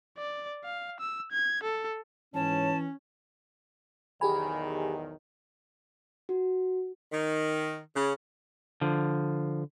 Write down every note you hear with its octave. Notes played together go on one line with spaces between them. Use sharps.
D5
F5
E6
G#6
A4
G#2 E3 C#4 C#5 A5
B1 E2 D#3 G4 G#4 G#5 B5
F#4
D#3
C#3
D3 F3